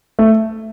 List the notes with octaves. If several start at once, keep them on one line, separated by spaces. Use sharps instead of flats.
A3